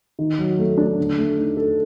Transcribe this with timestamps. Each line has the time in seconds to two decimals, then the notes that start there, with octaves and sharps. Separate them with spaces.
0.19 D#3
0.38 F#3
0.59 A3
0.78 D4
0.98 D3
1.18 A3
1.38 D#4
1.57 A4